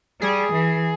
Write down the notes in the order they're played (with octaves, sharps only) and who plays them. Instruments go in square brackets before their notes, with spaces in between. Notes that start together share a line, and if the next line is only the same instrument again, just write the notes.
[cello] G3 [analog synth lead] G#4
[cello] E3